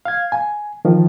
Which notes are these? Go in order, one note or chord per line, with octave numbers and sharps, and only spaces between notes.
F5 G#6
G#5
D#3 F3